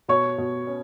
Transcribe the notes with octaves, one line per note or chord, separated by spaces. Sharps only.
B2 C#5 C#6
B2
C#4